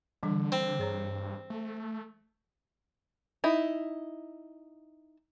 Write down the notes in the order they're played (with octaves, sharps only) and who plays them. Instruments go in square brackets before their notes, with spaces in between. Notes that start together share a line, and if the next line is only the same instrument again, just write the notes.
[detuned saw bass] D3 [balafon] E3 G3 D4
[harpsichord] C4 [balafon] B5
[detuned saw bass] G2 [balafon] G#4 C#5 A#5
[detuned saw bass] A3
[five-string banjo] D#4 E4